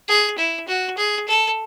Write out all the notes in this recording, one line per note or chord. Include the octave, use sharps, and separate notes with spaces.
G#4
E4
F#4
G#4
A4